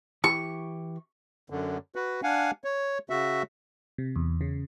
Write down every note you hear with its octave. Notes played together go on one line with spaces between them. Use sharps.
E3 E4 G4 C#6
F#2 D3
F#4 B4
D4 F5 F#5 G#5
C#5
C#3 F#4 E5
C3
E2
C#3